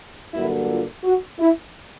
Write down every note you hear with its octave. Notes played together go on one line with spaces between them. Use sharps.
G2 D3 F#3 A#3 E4
F4
F#4
E4